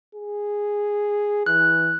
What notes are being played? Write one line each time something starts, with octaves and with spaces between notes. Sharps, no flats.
G#4
E3 F#6